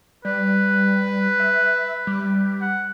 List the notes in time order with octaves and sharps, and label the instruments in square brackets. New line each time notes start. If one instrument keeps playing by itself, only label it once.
[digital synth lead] G3 [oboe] B4
[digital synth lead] E5
G3
[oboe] F#5